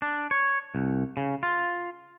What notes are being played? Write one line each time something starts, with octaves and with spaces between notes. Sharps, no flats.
D4
C#5
C2
C#3
F4